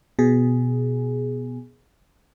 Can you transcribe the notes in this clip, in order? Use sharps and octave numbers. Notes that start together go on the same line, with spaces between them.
B2 G#4